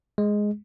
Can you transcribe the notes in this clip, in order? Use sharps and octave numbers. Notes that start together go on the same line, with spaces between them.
G#3